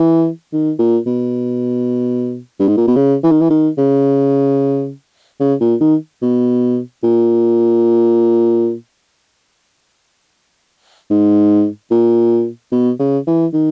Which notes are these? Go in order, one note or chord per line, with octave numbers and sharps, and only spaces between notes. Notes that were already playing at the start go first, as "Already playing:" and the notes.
Already playing: E3
D#3
A#2
B2
G2
G#2
A#2
B2
C#3
E3
D#3
E3
D#3
C#3
C#3
A#2
D#3
B2
A#2
G#2
A#2
B2
C#3
E3
D#3